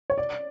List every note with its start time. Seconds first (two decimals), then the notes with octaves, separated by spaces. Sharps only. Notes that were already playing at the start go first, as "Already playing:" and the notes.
0.10 C#5
0.18 D5